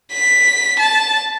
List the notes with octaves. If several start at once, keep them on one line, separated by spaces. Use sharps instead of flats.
B6
A5